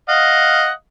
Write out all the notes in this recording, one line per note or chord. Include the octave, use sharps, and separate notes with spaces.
D#5 F5 F#5